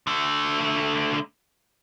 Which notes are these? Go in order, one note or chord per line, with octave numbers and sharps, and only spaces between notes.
D3 A3